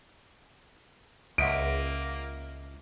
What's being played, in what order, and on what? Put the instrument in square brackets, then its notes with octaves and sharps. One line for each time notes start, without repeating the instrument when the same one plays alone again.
[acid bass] C#2 [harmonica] A#3 [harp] D#5 E5 F#5 [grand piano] D7